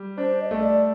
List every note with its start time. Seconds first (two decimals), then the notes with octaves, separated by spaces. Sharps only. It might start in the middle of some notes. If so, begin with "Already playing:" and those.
Already playing: G3
0.18 D4 C5
0.41 D#5
0.51 A3
0.62 D5